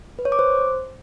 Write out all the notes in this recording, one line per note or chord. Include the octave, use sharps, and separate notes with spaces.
B4
C#5
D6
C5